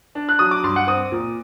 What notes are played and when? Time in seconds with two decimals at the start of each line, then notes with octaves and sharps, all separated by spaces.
0.15 D4
0.29 F#6
0.39 F#3 D#6
0.51 D6
0.63 G2 C6
0.76 F#5
0.87 C4 D#6
1.12 A#2